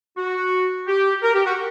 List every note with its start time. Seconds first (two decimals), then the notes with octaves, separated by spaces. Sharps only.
0.17 F#4
0.88 G4
1.23 A#4
1.34 G4
1.45 F#4